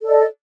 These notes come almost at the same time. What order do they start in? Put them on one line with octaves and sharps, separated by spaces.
A4 D5 D#5